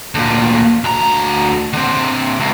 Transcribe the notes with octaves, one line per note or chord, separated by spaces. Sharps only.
D2 A#2
D2 A#5
D3 C4
C#2